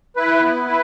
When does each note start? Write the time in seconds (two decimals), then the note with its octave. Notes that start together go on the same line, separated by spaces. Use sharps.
0.16 E4 B4
0.41 B3
0.66 E4 B4